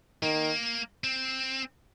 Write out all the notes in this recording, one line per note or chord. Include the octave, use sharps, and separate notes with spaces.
D#3 A#3
C4